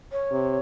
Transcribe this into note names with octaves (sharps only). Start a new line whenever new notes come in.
C#5
C3